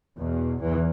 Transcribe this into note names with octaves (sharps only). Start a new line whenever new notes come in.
E2 B2
E2 E3